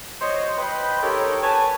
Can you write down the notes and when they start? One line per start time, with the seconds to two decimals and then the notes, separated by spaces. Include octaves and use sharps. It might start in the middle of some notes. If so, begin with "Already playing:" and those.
0.22 F#3 C5 C#5 D#5
0.57 B4 C5 D#5 G5 B5
1.03 D#4 G4 A4 A#4 C#5
1.43 B4 C#5 G#5 A5